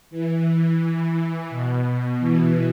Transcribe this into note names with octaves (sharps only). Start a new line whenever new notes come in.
E3
B2
E3